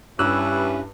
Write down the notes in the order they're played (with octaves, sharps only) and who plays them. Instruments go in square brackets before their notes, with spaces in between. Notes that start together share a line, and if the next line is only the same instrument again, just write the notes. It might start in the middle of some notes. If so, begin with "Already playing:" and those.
[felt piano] G2 [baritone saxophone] G3 [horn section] C#4 E4 B4 [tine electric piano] E6 F#6